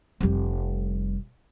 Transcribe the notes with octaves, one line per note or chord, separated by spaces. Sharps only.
F1 G3